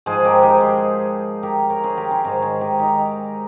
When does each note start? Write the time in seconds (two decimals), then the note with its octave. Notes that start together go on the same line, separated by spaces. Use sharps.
0.06 G#2 F3 G#4 C5
0.24 G4 A#4
0.43 D#4 G4
0.61 G#4 C5
1.43 G4 A#4
1.70 A#4 C#5
1.84 G#4 C5
1.97 G4 A#4
2.11 G#4 C5
2.25 G#2 D#3 A#4 C#5
2.42 G#4 C5
2.61 G4 A#4
2.79 D#4 G4